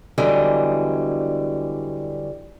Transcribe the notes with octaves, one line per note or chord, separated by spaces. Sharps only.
E2 D3 E3 F#3 G3 D#5